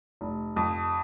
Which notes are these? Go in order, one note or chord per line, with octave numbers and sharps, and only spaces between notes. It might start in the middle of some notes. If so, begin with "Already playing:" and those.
F1
F2